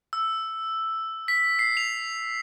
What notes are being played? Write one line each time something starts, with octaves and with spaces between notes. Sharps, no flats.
E6
B6
C7
F7